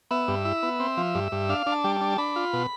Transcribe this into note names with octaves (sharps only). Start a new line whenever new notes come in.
B3 E5
G2
E4
B3
C4
F3
G2
G2
D4 F5
D4
A5
G3
D4 A5
D4 B5
F4
B2